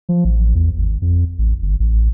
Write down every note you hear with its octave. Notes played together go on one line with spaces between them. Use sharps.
F3
A1
E2
G#1
F2
A1
G1
A1